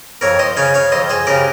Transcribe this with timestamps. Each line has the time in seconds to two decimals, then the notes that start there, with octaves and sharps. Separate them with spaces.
0.21 F2 A#4 C#5
0.39 C5 D#5
0.57 C#3 C#5 F5
0.74 C#5 F5
0.92 F2 C5 D#5
1.10 G#4 C5
1.27 C#3 G4 A#4